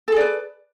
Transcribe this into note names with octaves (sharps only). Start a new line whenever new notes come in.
G#4 A4 B4 D5